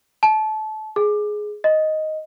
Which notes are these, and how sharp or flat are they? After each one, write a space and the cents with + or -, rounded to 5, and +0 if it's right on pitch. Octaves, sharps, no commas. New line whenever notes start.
A5 -25
G#4 +10
D#5 +5